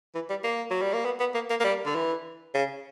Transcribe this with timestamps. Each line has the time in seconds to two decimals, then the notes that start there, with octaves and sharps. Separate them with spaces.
0.15 E3
0.30 G3
0.44 A#3
0.71 F#3
0.81 G3
0.93 A#3
1.05 B3
1.20 B3
1.35 A#3
1.50 A#3
1.60 A#3
1.64 G3
1.86 D3
1.95 E3
2.54 C#3